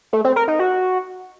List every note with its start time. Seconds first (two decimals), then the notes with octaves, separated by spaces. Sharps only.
0.13 A3
0.24 C4
0.36 A#4
0.48 D#4
0.59 F#4